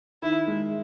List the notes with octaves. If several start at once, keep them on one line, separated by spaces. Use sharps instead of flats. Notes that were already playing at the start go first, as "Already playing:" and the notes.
D#3 E4
G#3